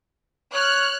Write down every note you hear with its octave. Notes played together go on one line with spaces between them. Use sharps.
C#5 F6 F#6